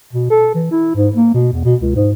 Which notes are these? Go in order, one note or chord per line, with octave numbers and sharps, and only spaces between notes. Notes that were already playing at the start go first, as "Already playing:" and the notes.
B2
A4
E3
E4
G#2
A#3
B2
E2
B2
C#2
G#2